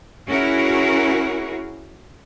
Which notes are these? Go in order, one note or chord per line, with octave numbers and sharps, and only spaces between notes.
C#4 E4 F#4 G#4 A#4